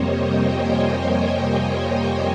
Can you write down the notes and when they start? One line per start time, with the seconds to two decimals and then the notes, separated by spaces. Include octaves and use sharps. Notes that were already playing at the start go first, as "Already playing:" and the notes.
Already playing: F2 C3 G3 A#3 C5 C#5 D#5
0.19 G5
0.49 G#5
1.67 G5